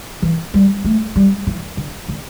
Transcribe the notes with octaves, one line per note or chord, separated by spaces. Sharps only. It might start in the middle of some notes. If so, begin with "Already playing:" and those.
E3
G3
A3
G3
E3
D3
D3